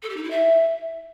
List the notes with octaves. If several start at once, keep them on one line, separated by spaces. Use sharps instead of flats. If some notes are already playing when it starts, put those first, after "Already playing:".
A4
G4
D#4
E4
E5